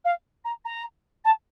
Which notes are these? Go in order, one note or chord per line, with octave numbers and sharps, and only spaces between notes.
F5
A#5
A#5
A5